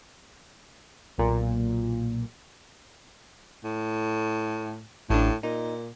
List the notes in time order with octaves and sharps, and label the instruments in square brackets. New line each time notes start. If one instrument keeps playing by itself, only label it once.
[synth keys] B1 A#2
[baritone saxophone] A2
[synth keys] A1 D4 [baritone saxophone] A2
[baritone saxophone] A#2 [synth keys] D#4